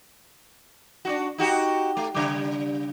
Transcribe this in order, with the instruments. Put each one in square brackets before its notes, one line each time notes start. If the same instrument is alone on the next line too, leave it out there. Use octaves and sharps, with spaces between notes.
[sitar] D4 D#4 F#4
D#4 F#4 G4
A3
C#3 G3